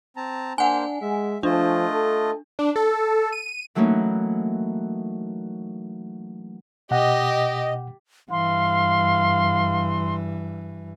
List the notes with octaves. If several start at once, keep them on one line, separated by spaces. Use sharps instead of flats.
C4 A5 A#5
A#3 D4 C5 F#5 G#5
G#3 E5
F3 A3 D4 F4 D#5
A4
D4
A4
D#7
E3 F#3 A3 A#3 C#4 D#4
B2 G4 D#5 F#5
G2 E3 F5 C6